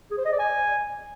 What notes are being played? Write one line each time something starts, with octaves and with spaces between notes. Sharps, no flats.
G#4
C5
D#5
D5
G#5